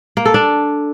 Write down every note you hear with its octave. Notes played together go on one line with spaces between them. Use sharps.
A#3
A4
D4